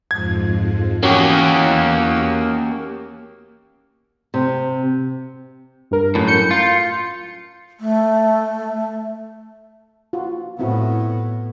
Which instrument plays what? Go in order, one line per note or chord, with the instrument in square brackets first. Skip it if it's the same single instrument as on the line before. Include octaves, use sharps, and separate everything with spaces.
[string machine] F2 G#2 F3 [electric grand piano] G#6
[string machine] E2 E6 [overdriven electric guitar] A#3 G4 [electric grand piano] C#4 F#4
[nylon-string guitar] C3
[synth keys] G2 A#4
[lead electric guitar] F#2 A2
[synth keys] G6 C#7
[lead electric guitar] F4
[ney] A3
[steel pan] F4 F#4
[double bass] A2 B3 [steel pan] C4 E4 F#4